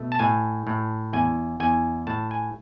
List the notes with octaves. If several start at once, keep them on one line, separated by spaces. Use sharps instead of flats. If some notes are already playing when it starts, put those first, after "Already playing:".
Already playing: B2 A3
A5
A2 G#5
A2
E2 G#5
E2 G#5
A2 A5
G#5